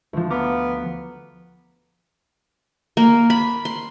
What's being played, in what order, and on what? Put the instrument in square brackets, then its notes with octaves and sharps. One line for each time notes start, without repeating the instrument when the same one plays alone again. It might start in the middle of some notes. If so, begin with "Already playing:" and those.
[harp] D2 F3
[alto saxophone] B3 [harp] F5 A#5 D6
[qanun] A#3
B5
C6